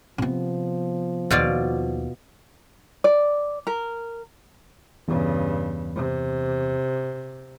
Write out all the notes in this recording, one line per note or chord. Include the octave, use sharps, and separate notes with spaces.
C3 F3 B3
D#2 B2 F4 D5
D5
A#4
E2 G2 C#3
C3